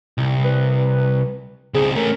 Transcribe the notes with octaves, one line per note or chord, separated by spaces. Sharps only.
C2
B4
C#2 C4 G#4
A3 C#4 A#4